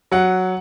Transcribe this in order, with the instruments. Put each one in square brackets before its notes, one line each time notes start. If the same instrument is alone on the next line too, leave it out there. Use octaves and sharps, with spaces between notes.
[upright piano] F#3 F#5